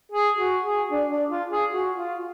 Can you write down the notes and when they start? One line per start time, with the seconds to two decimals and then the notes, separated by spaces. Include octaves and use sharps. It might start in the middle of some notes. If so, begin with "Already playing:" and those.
0.12 G#4
0.37 F#4
0.64 G#4
0.90 D4
1.10 D4
1.30 F4
1.51 G#4
1.71 F#4
1.97 F4